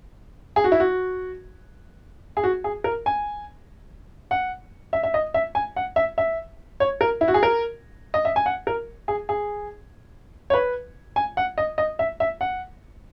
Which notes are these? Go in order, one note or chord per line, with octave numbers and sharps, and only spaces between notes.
G#4
F#4
E4
F#4
G#4
F#4
G#4
A#4
G#5
F#5
E5
E5
D#5
E5
G#5
F#5
E5
E5
C#5
A#4
E4
F#4
G#4
A#4
D#5
E5
G#5
F#5
A#4
G#4
G#4
C#5
B4
G#5
F#5
D#5
D#5
E5
E5
F#5